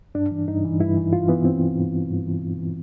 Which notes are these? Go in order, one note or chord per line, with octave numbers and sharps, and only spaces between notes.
G2 D4
E3
G2 D#4
E3
G2 E4
E3
G2 F4
E3 B3
G2 C4
E3
G2
E3
G2
E3
G2
E3